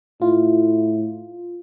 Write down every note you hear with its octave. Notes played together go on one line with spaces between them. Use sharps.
A2 E4 F4